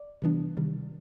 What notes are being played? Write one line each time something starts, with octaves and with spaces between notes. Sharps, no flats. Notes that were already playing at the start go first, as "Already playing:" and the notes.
Already playing: D5
C3 E3 G3 B3 D4
C3 D#3 G3